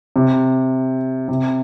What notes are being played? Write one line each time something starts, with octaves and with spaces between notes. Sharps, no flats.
C3
C3